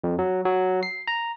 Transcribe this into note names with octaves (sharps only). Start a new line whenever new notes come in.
F2
F#3
F#3
C7
A#5